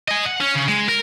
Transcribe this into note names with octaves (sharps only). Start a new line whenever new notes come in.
D#5 G#5
F#5
C#4
C#3
G#3
A#4